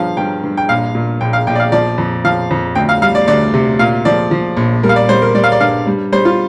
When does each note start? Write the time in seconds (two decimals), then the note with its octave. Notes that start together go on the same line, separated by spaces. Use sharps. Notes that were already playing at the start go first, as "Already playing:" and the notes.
Already playing: G2 F3 F5
0.17 G2 G5
0.43 G2
0.57 G5
0.69 A#1 F5
0.95 A#2
1.21 A#1 G5
1.33 F5
1.47 A#1 G5
1.55 D5
1.60 F5
1.72 F3 D5
1.98 F2
2.24 F3 F5
2.51 F2
2.75 D2 G5
2.89 F5
3.02 G3 F5
3.15 D5
3.28 D2 D5
3.54 C3
3.79 A#2 F5
4.05 F3 D5
4.31 F3
4.57 A#1
4.83 G3 A#4
4.89 F5
4.96 D5
5.09 G3 C5
5.22 A#4
5.35 G3 D5
5.44 F5
5.52 D5
5.60 G2 F5
5.87 G3
6.12 G3 C5
6.25 F4